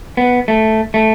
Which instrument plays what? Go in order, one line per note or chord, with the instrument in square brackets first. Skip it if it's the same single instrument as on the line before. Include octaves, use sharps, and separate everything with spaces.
[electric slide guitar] B3
A3
A3